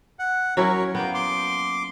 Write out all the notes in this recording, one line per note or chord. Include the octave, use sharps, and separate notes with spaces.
F#5
F#3 C#4 E4 A#4 C#5
A#3 B3 G5
C6 D6